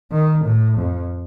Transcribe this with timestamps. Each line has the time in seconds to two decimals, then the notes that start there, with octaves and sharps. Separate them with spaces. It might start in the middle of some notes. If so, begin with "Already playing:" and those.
0.12 D#3
0.45 A2
0.78 F2